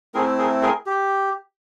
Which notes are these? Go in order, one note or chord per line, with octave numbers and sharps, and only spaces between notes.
A3 C4 E4 G#4 A#4
G#4 A#4
G#4 A#4
G4